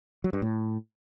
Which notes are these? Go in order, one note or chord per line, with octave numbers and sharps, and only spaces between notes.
F#3
G2
A2